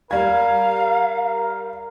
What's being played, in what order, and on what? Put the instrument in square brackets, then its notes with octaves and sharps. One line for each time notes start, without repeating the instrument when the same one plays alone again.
[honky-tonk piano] G3 G#6 [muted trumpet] A#4 [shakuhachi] F5